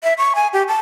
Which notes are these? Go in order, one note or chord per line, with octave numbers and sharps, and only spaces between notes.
E5
C#6
G#5
G4
A5